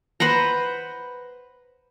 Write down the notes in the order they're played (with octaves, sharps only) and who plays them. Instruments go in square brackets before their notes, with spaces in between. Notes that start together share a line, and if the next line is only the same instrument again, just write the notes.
[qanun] B4 C5 F#5 A#5